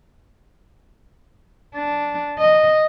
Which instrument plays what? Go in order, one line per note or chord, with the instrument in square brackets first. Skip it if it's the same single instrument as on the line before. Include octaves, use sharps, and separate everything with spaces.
[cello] D4
D#5